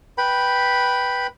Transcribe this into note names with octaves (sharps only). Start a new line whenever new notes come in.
B4 G5 B5